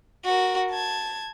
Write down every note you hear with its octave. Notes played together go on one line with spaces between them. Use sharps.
F#4 A#4
A5 G#6